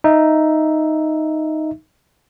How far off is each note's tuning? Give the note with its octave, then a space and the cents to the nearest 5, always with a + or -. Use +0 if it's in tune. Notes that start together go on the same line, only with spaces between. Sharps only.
D#4 +0 E5 +0